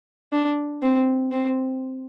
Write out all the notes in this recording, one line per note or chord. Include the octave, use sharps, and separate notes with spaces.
D4
C4
C4